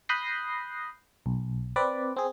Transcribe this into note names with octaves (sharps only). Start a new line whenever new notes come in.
B5 D#6 F#6 G6 A#6 C7
B1
C4 B4 D5
C4 G#4